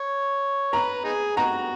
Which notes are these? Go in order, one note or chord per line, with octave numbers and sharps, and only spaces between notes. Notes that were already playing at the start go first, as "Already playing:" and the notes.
Already playing: C#5
B4 A#5
B3 D#4 G#4
B3 D#4 F#4 A#5